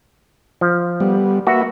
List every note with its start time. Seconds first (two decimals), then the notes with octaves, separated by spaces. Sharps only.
0.61 F3
1.00 G3 B3
1.47 A#3 F#4 B4 E5